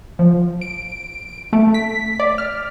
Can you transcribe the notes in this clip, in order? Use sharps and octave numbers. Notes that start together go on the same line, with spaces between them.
F3
D7
A3
B6
D5
F6